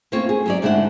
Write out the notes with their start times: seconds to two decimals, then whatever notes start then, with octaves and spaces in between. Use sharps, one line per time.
0.12 A3 A#3 C4 C#4 F4 C#5
0.29 G#4
0.46 F#3 C#4 D5
0.62 G#2 D3 A3 D4 E4 F#5